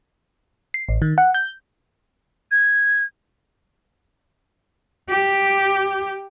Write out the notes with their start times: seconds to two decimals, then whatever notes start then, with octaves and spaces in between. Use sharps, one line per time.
0.74 C7
0.89 A1
1.02 D#3
1.18 F#5
1.34 G6
2.51 G#6
5.10 G4